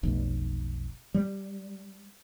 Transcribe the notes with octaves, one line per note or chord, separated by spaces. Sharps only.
F1 B1
G3